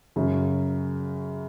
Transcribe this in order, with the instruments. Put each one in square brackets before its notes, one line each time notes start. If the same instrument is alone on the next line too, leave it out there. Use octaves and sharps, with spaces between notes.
[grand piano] F#2 C#3 F#3